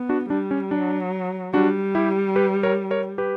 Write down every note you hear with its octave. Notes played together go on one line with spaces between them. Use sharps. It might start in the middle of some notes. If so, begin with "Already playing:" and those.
Already playing: B3
D4 F#4
G3 D4
C#4
F#3 D4
G3 D4 F#4
E4 G4
G4 B4
A#4 C#5
A#4 C#5
G4 B4